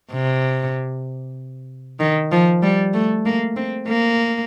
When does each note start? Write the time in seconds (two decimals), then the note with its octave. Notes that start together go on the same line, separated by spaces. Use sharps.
0.12 C3
2.00 D#3
2.32 F3
2.62 G3
2.94 A3
3.26 A#3
3.56 C4
3.88 A#3